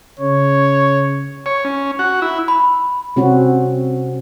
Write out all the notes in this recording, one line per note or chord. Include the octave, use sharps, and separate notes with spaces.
C#3 C#5
C#5
C#4
F#4
E4
B5
C3 C4 C#4 F#4